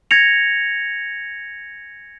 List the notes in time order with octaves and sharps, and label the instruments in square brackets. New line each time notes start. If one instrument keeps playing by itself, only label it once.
[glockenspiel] G#6 A#6 C#7 F7